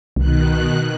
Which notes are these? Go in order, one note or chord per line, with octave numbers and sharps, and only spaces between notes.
C2 B2 D#3 F#6